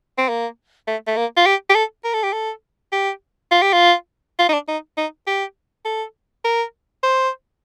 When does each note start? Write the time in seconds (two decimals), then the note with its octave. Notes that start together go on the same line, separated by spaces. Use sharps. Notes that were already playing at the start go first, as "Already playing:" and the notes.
0.18 C4
0.29 A#3
0.88 A3
1.07 A3
1.17 A#3
1.37 F4
1.46 G4
1.70 G4
1.75 A4
2.05 A#4
2.14 A4
2.23 G4
2.33 A4
2.92 G4
3.52 F4
3.62 G4
3.73 F4
4.39 F4
4.49 D#4
4.53 D4
4.68 D#4
4.98 D#4
5.27 G4
5.85 A4
6.45 A#4
7.03 C5